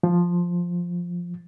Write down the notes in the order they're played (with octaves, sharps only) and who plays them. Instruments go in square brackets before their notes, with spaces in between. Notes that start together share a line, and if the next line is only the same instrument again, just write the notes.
[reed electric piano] F3